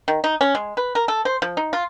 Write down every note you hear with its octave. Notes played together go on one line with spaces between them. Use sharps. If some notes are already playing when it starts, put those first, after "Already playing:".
D#3
D#4
C#4
G#3
B4
A#4
A4
C5
F3
D#4
F4